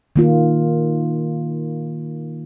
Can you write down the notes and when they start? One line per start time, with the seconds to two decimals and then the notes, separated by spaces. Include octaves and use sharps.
0.16 D#3 A#3 F4